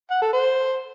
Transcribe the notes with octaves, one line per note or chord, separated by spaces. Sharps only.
F#5
A4
C5